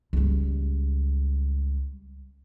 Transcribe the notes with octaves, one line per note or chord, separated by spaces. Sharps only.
C#2 G3